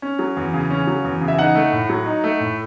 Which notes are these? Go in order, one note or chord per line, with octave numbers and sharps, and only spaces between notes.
C#4
F#3
E2
C#3
C#4
F#3
E2
C#3
E5
D#4 F#5
A3
A2
F#3
D#4
A3
A2